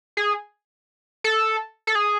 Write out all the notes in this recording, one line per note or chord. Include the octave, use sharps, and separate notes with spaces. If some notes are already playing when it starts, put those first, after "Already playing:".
G#4
A4
A4
G#4